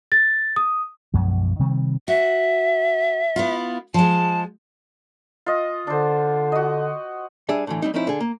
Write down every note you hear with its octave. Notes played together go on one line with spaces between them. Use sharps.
A6
D#6
B1 F#2 F3 G#3
C3 D#3 G3 C4
F#4 E5
B3 E4 F4
F3 G#3 A5
F4 D#5
D3 D4 C5
F#4 D#5
G3 D4 G#4 D5 E5
A2 D3 E3
G3 A3 C4 D#4
F3 C4 C#4 D#4 E4
D3 G#4
A#3